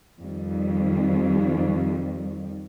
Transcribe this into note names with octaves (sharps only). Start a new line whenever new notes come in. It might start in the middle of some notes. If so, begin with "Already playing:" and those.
F2 D#3 G3